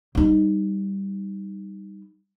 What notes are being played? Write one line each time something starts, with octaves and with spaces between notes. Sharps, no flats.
G3 D#4